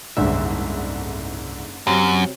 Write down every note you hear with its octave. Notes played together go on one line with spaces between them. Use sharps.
F#1 C2 G#2 D3 E5
F#2 C3 F#3